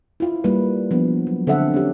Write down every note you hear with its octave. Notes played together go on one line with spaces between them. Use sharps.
E4 F4
G3 A#3 B4
F3 B3 D4
F#3
D3 C4 A4 E5 F#5
C#4 G4